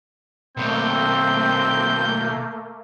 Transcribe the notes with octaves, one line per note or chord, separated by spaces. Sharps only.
B2 D#3 A3 A#3 C4 G6